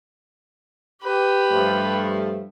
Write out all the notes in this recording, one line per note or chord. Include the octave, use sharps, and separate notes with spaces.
G4 B4
G2 F3 A3